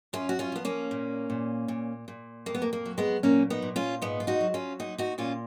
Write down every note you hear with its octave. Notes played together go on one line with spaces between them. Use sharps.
F#2 C#4 F4
F#4
C#4 F4
F3 B3
A#3 C#4
A#2
A#2
A#2
A#2
F2 A#3
B3
A#3
A#3
F#3
G#3 B3
A#2 A#3 C#4
B3 D#4
A#2
C#4 F4
G#2 B3 D#4
F4
D#4 F#4
F#3
C#4 F4
A#2 D#4 F#4
D#4 F#4
A#2 C#4 F4